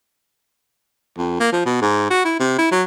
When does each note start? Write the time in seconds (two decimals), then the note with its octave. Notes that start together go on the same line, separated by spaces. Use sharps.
1.18 F2
1.40 A#3
1.52 F3
1.66 B2
1.82 G#2
2.10 F#4
2.25 E4
2.40 C3
2.58 E4
2.71 F#3